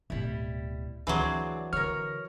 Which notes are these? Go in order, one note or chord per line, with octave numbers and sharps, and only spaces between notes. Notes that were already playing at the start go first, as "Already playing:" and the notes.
D1 B2 G3 E4
D2 E3 F#3 C4 D4 G#4
D3 A#4 C#5 F6